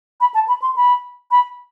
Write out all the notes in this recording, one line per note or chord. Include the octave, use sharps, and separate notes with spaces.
B5
A5
B5
C6
B5
B5